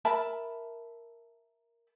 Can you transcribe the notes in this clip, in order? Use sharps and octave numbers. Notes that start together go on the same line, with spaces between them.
A#4 E5 A5 B5